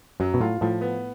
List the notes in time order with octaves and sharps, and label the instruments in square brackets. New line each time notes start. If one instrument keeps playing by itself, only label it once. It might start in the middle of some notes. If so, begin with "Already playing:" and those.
[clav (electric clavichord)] F#2 [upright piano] F#3
[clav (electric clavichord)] B2
[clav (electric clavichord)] A2 [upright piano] F4
[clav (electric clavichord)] A2 [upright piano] F3
[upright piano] B3